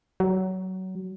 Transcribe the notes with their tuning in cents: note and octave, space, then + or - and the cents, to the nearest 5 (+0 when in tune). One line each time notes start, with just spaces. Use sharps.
F#3 +20